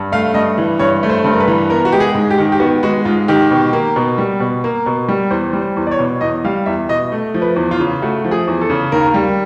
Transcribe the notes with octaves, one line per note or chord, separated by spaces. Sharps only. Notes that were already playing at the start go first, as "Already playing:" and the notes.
Already playing: G2
A3 F5
G2 D#5
E3
G2 C#5
A3
C5
G2
A#4
B4
E3
B3 A#4
F#4
G#3 G4
G#4
G#2
G4
D#3
G4
B3 F#4
G#3 F#4
G#2 F4
D#3 G4
B2
A#3
B2
G3
B2
A#3
B2
G3
E2 C5
G3
C5
E2
D5
C#5
B2
E2 D#5
G3 F5
E2 E5
B2 D#5
A3
F3
B4
E2
F4
C#3
A3 F#4
F3
G#4
E2
A4
C#3
D#2 A#4
G3